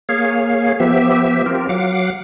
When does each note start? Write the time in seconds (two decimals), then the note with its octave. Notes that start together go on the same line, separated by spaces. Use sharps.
0.09 A#3 G#4 C#5 F5
0.80 F3 B3 G4 E5
1.46 C4 F4 G4 A#4
1.69 F#3 F5 F#5 D6